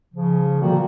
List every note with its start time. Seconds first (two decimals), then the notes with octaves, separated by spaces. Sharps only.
0.14 C#3 F3
0.61 A#2 D3 D#3 G3 A#3 F#4